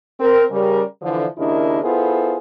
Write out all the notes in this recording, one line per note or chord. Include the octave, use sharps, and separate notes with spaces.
C4 A#4
C#3 G3 A#4
D3 E3 F3
D#2 C#3 D4 E4 A#4 D#5
B3 E4 F4 G#4 A4 C5